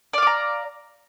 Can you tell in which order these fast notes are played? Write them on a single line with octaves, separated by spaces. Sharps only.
D5 F5 D6 A#5